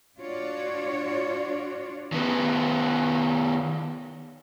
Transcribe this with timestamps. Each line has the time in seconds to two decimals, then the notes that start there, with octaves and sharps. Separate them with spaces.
0.17 D4 F4 F#4 C#5 D5
2.12 D#3 B3